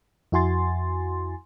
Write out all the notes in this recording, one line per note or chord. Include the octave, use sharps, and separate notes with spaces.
F2 E4 F#4 G#5 C6 A6